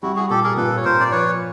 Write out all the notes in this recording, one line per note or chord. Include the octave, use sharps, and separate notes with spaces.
G3 E4 F#4
F#4 G#4
A#2 G4 A4
G#4 A#4
A#2 A4 B4
C#5
A#2 A#4 C5
D5
F3 B4 C#5